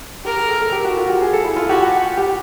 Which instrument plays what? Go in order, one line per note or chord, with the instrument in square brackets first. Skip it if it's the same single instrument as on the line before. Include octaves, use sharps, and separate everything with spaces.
[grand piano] G4 [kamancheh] A#4
[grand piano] G#4
A4
A4
G4
F#4
F4
G4
G#4
A4
E4
F4
[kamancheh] F#4 [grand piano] G4
[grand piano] G4